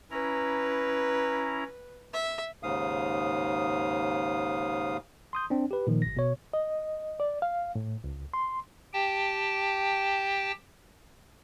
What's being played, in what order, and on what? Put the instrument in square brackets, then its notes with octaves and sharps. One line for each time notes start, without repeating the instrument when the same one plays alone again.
[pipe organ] C#4 E4 A#5 [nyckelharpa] B4
[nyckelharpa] E5
[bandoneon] D#2 G#2 C#3 F5 D#6
[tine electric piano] C6 D#6 G6
C4 D4
G4 B4
A#2 D#3 F3
G#1 A#6
B2 C#5
[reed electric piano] D#5
D5
F5
A2
C#2
C6
[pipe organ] G4 G5 A5